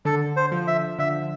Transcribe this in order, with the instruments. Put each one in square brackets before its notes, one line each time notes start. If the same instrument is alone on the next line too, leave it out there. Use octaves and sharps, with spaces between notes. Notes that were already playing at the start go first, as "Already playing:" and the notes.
[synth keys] D3 [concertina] A4
[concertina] C5
[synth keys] F3
[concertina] E5
[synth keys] D3 [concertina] E5